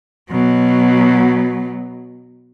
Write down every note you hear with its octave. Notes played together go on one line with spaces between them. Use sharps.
B2 F#3